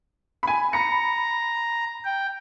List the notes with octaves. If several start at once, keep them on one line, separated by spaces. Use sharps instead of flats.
G#5 B5
A#5 B5 C#7
G5